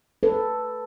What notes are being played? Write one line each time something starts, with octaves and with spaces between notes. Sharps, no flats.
A4 B4